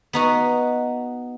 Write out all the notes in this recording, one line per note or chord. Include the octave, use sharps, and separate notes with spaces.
B3 D#4 F#4